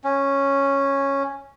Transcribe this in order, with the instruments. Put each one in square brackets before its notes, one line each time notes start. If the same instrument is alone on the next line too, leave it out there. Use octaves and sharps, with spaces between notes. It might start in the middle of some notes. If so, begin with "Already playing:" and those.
[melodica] C#4